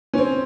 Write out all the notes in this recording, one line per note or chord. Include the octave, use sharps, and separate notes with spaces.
C#4
C4